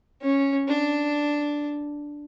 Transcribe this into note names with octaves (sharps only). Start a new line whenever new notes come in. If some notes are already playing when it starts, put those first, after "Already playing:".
C#4
D4